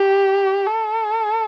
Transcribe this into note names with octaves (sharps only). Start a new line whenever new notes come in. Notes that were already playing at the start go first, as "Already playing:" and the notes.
Already playing: G4
A4